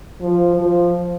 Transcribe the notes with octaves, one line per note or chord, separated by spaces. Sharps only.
F3
F3